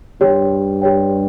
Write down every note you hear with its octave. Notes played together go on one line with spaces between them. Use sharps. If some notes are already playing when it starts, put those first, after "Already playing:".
G2 G4 C#5 G5
G4 C#5 G5